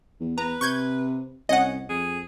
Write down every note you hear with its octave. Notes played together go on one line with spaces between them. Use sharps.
E2
E2 B4 A#5
C3 C#6 G6 G#6
C2 C#4 D#5 F#5
F2 G#4